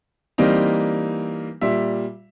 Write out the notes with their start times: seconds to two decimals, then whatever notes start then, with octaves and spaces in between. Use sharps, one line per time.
0.38 E3 G3 A#3 C4 D#4
1.61 A#2 G3 E5